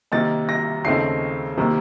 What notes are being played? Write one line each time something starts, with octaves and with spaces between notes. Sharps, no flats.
C3 D#3 A#3 D#4 A6
A#6
D#2 C#3 A3 C4 D#4 C7
C3 D#3 A#3